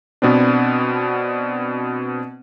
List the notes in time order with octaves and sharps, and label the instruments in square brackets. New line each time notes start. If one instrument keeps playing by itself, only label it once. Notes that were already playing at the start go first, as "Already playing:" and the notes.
[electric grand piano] B2 B3 C4 D4